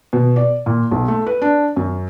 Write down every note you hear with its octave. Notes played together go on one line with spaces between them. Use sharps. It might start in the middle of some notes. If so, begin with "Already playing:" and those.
B2
D5
A#2
B1
A3
B4
D4
F#2